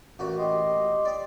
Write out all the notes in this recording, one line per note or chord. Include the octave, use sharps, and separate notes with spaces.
A1 A#2 F#4
G4 D#5 C6
D5